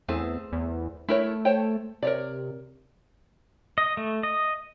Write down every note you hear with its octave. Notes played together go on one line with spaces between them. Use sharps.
E2 A3 C4 G#4
E2
A3 E4 A#4 C#5
C5 C#5 G5
C3 A#4 C#5 D5
D#5
A3
D#5